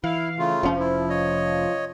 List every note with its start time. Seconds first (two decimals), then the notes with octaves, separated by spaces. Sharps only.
0.04 E3 E4 F5
0.39 C#3 A3 F4
0.63 F1 F3 C#4
0.79 E4
1.10 C#5 D#5